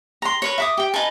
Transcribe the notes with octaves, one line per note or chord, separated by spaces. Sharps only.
A#5 C6
A#4 B4 C#5
E5 D6 D#6
G4 G5
D#4 B4 G#5 A5